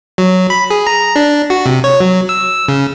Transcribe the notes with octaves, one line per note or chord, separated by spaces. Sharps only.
F#3
B5
G#4
A#5
D4
F#4
C3
C#5
F#3
E6
C#3